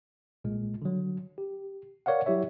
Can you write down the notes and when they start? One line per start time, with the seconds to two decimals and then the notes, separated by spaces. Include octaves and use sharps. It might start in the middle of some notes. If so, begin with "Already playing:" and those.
0.44 B1 A#2 G#3
0.82 D3 F#3
1.38 G4
2.06 A#4 C#5 D5 F5 F#5
2.26 F#3 E4 G4 C#5 E5